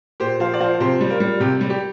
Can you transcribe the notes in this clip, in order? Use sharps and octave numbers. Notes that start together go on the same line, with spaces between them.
A#2 G4 C5
F3 C5 F5
D5
F3 C5 F5
C3 G4 C5
G3
F4 A#4
G3
C3 G4
G3
G4